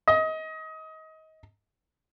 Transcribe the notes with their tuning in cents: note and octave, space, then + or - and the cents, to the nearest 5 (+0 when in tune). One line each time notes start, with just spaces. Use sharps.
D#5 +25